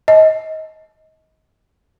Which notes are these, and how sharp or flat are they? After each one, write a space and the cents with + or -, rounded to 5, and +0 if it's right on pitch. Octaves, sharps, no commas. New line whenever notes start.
D#5 +25